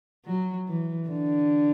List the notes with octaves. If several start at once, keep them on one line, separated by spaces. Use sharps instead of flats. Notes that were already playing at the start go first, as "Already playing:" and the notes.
F#3
E3
D3